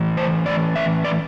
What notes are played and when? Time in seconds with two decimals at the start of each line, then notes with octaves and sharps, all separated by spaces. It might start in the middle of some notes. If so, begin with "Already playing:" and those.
Already playing: A2 E3
0.17 C5
0.46 D5
0.76 E5
1.04 D5